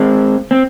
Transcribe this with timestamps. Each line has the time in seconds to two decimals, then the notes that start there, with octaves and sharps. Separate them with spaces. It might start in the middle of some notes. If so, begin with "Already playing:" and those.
Already playing: G#3 C4
0.51 C4